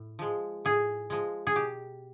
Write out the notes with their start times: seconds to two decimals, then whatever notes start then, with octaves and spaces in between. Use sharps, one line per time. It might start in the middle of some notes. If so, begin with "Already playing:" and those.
Already playing: A2
0.19 F3 G#3
0.65 A2 G#4
1.10 F3 G#3
1.47 G#4
1.55 B2 G4